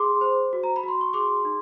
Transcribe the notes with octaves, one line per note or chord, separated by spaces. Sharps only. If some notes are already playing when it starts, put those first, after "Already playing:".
Already playing: G#4 C6 D6
C5
F#4
A#5
B5
F#4 C6
C#6
G#4 C6 D6
D#4